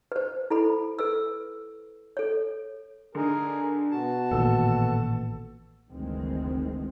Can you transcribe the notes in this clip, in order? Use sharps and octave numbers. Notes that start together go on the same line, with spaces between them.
B4 C5
E4 A4 B5
A4 B4 E6
A4 C#5
D3 D#4 G#4 A#4
B2 F#4 A5
A1 A#2 D#3 A4 E6
F#1 D2 D#3 E3 G#3 C4